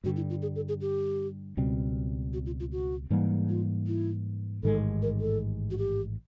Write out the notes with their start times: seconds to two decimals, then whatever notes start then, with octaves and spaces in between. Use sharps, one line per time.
0.04 G2 D3 G3 F#4
0.16 E4
0.30 F4
0.42 G#4
0.56 A4
0.68 G#4
0.81 G4
1.57 C#2 B2 G3 C4
2.33 F#4
2.46 F4
2.60 F4
2.72 F#4
3.10 G#2 E3 G3 A#3
3.49 F4
3.87 E4
4.63 A1 G#2 D#3 G#3 A4
5.02 A#4
5.20 A4
5.71 F#4
5.78 G4